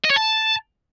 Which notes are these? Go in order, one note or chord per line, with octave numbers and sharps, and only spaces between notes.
D#5
C#5
A5